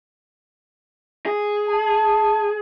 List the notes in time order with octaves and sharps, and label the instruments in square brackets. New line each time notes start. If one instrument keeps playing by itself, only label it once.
[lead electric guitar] G#4
[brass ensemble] A5